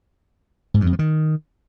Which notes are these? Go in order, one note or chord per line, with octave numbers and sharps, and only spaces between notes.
G#2
G2
F2
F3
D#3